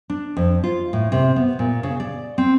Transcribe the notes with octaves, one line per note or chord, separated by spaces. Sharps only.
D4
F2
F4
A2
C3
B3
A#2
C#3
D5
C4